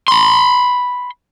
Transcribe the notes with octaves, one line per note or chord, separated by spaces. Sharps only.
B5 C6